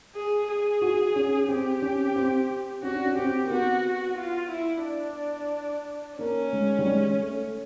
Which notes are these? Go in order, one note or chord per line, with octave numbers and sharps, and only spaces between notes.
G#4
G#4
F#4
C#4
C4 G4
C#4
C4
C#4 F#4
D4
C#4
C4 G4
A#3
B3 F#4
F4
E4
D4
A#3 C#4
G#3
G3
G#3
A3